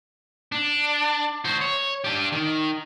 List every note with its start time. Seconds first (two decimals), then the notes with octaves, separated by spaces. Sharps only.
0.52 D4
1.45 F#4 C5
1.61 C#5
2.04 D4 G4
2.32 D#3